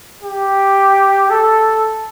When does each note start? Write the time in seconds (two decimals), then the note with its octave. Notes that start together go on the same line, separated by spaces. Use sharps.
0.23 G4
1.30 A4